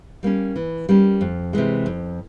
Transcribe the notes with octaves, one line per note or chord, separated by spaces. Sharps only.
G3 A#3 C#4
E3
G3 A#3 C#4
F2
C3 E3 G#3
F2